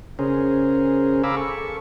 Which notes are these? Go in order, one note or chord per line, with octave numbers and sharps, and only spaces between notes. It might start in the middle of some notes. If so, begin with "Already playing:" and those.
C#3 C#4 G#4 A#4 C5
F5 G#5 A#5 B5 D6 E6
A4 C#6